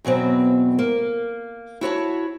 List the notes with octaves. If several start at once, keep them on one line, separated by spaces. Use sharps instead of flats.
E2 B2 F#3 C4
A#3
E4 F#4 C#5 A5